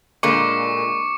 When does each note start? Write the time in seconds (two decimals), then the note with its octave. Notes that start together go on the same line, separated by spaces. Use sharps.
0.23 A#2 D3 G#3 A#3 D4 C#6 D6 C#7